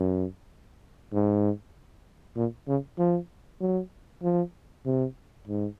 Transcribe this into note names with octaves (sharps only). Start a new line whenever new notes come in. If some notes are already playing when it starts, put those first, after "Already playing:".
Already playing: F#2
G#2
A#2
C#3
F3
F#3
F3
C3
G#2